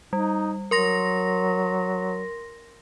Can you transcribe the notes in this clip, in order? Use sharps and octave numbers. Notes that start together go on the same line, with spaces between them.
G3 D#4
F#3 A#4 C6 A#6